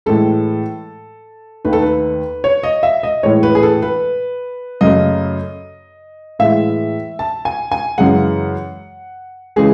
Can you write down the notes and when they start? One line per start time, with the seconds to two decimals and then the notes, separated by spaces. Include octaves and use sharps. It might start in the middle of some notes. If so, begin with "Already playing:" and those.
0.06 A2 E3 G#3 A4
1.65 D#2 D#3 A3 B4
1.73 A4
1.82 B4
2.44 C#5
2.63 D#5
2.83 E5
3.03 D#5
3.23 A2 E3 G#3 C#5
3.43 B4
3.55 G#4
3.63 A4
3.82 B4
4.81 F#2 C#3 F#3 A3 D#5
6.39 A2 E3 G#3 E5
7.19 A5
7.45 G#5
7.72 G#5
7.98 F#2 C#3 E3 G#3 F#5
9.56 C#3 E3 G#3 G#4